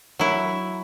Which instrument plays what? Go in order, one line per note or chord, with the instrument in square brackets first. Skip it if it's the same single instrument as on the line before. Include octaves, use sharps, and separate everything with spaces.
[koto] F#3 E4